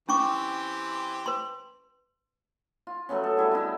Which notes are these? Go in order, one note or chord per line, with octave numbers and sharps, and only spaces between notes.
E3 C4 C#4 G4 C#6 D6
B4 C6
F4
F#3 A3 B3 C#4
A4
G3 E4 G#4
D3 D#4 E4